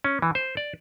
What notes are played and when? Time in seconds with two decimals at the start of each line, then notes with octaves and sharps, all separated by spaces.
0.04 C#4
0.22 E3
0.35 C5
0.57 D5